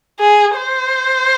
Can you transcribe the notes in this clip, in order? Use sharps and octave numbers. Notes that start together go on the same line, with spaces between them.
G#4
C5